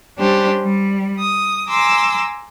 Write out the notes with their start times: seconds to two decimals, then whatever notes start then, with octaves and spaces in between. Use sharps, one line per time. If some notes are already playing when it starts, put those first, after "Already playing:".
0.17 G3 C#4 D4 G4 C5
0.63 G3
1.20 D#6
1.70 G#5 A#5 C6 D6 E6